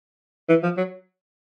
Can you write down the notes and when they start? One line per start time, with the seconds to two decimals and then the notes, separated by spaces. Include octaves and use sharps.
0.49 E3
0.63 F3
0.77 F#3